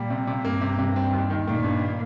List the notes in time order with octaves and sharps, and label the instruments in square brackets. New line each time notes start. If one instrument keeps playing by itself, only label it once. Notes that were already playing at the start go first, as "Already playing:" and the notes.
Already playing: [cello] A#2 [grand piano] G3
[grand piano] C3
C3
[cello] G2 [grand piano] A#3
[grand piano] C3
C3
C4
D#2
D#3
[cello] A#2 [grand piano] D#3
[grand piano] G2